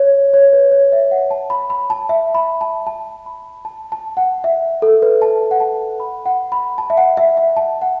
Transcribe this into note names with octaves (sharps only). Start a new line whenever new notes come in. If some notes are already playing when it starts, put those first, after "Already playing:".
Already playing: C#5
C#5
B4
C#5
E5
F#5
A5
B5
B5
A5
E5
B5
A5
A5
B5
A5
A5
F#5
E5
A4
B4
A5
F#5
A5
B5
F#5
B5
A5
E5
F#5
E5
E5
A5
F#5